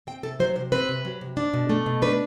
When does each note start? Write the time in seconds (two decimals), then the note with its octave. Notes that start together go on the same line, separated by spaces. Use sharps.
0.07 C4 G5
0.23 C3 A4
0.40 F#3 C5
0.56 C3 C5
0.72 C4 B4
0.89 C3
1.05 F#3
1.21 C3
1.37 D4
1.53 B2
1.69 A3
1.86 B2
2.02 D4 B4